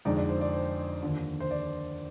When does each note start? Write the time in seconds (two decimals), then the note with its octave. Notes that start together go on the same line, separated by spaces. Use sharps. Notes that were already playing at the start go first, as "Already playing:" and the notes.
0.05 F2 D3 G#3 D#4 D5
0.17 D5
0.29 C5
0.41 D5
0.54 C5
1.02 D#2 D3 F3
1.40 C5
1.51 D5